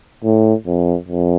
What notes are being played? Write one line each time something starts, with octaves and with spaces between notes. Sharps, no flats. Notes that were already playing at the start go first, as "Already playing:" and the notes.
A2
F2
F2